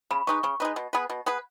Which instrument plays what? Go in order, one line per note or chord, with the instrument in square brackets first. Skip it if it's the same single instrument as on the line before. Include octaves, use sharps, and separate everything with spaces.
[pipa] C#3 [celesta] B5
[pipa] G#3 D#4 B4 [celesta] C#6
[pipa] C#3 [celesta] C#6
[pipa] G#3 D#4 B4
B2
B3 G#4 B4
B2
B3 G#4 B4